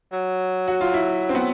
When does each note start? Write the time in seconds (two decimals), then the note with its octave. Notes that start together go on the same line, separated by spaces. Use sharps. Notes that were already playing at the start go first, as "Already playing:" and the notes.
0.12 F#3
0.68 F#4
0.81 F4
0.94 E4
1.29 C4
1.35 B3